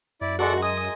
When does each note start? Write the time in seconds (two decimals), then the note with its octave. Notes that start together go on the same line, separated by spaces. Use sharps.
0.21 F#2 E4 D5
0.39 G#3 F#4 A4 A#4 D5 E5 F#5
0.63 D#5 G#5 D#6